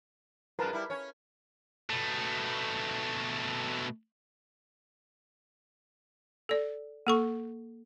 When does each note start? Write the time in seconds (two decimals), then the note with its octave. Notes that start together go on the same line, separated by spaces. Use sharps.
0.59 F#2 G#3 F4 A#4 B4 A5
0.73 G3 E4
0.90 C#4 C#5
1.90 B2 A3
6.49 A4 D5
7.07 A#3 A4 C#6